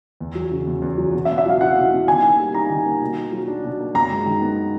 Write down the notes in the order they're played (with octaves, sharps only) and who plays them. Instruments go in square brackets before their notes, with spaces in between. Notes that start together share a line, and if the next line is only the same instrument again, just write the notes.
[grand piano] E2
F#3
C#3
E2
E2
F#3
B2
[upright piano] E5
[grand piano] B3
[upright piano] E5
[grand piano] F#3 [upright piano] F5
[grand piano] E4 [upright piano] F#5
[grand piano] B2
B3
[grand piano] D#3 [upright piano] G#5
[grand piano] A#3
G3
[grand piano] D#4 [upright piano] A#5
[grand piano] D#3
A#3
B2
A#3
F#3
D4
B2
A#3
[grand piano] F#2 [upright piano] A#5
[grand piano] G#3
D#3
B3